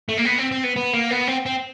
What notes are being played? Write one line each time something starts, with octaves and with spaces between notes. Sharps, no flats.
A3
A#3
B3
C4
C4
B3
B3
A#3
B3
C4
C4